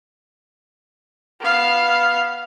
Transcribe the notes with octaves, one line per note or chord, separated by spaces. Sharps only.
B3 F5